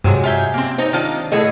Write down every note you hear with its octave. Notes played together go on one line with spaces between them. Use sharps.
G2 C3 F#3 G#3
F4 E5 G#5 G6
A#3 C4
C4 D#4 C#5
D#3 D4 F4
A2 D3 G#4 C#5 D#5